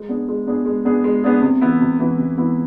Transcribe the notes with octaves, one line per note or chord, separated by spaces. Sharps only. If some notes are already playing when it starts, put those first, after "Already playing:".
Already playing: G#3
B3 D4 G#4
G#3
B3 D4 G#4
G#3
B3 D4 G#4
G#3
B3 D4 G#4
C3
E3 B3 E4
C3
E3 B3 E4
C3
E3 B3 E4